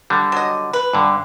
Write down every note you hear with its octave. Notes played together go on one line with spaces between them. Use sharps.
D3 G3
F#3 D#5
B4
G2 D3